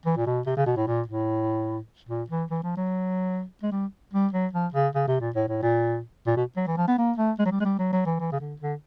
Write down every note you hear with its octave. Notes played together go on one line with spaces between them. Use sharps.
E3
A#2
B2
C3
C#3
B2
A2
A#2
A2
A#2
E3
E3
F3
F#3
G#3
G3
G3
F#3
F3
C#3
C#3
C3
A#2
A2
A2
A#2
A#2
B2
F#3
E3
F3
B3
A#3
A3
G#3
F#3
G3
G#3
G3
F#3
F#3
E3
E3
C#3
D3
D3